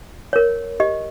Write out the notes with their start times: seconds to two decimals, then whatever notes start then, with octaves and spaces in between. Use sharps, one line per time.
0.33 A#4 C#5
0.80 G4 D#5